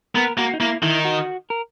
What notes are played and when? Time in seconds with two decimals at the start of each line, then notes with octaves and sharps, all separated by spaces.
0.15 B3 A#4
0.37 A#3 F#4
0.54 D#4
0.60 A#3 E4
0.83 D#3 E4
1.05 F#4
1.50 A#4